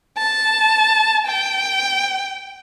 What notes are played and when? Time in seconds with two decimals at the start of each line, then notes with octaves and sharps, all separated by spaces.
0.19 A5
1.27 G5